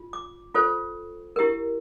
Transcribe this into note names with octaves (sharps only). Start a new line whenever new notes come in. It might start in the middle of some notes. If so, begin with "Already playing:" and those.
Already playing: F4
D6
F4 A4 C5
E4 G4 A#4